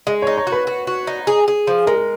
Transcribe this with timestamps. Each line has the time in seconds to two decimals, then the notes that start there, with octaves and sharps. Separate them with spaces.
0.07 G#3 D#5
0.22 C#5
0.27 D#4
0.37 C#5
0.47 F#4
0.52 B4
0.67 F#4
0.87 F#4
1.07 D#4
1.27 G#4
1.48 G#4
1.67 F3
1.87 G#3 A#4